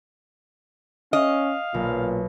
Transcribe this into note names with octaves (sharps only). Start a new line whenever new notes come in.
C#4 D#5 F5
B1 A#2